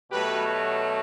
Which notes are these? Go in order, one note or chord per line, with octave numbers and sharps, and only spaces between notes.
B2 F#3 A3 G4 B4